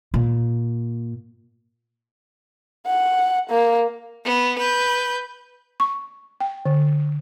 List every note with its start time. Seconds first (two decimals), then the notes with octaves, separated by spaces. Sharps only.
0.14 A#2
2.86 F#5
3.50 A#3
4.25 B3
4.59 B4 G6
5.80 C#6
6.40 G5
6.65 D3